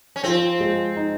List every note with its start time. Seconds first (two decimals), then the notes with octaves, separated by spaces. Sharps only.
0.16 C#4
0.24 F3 C4
0.60 G#3
0.96 D#4